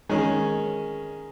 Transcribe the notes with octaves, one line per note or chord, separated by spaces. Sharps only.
D#3 G#3 C#4 G#4